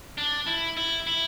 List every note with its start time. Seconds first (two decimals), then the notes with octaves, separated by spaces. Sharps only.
0.18 D4
0.47 E4
0.77 E4
1.07 E4